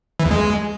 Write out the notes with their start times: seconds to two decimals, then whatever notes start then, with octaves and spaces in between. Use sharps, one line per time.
0.20 E3
0.25 E2
0.31 G#3